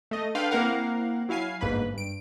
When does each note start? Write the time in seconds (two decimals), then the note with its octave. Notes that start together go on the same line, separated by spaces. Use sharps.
0.11 A3 D#5
0.35 D4 A4 B4 F5 G5 C6
0.51 A#3 C4 E4 A#4 F5 F#5
1.29 F#3 E4 F5 G#5 C7
1.61 G1 G#2 A#3 B4 B5
1.94 G2 D7